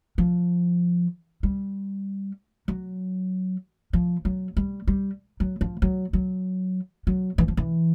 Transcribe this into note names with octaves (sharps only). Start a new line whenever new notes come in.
F3
G3
F#3
F3
F#3
G3
G3
F#3
F3
F#3
F#3
F#3
E3
F3
E3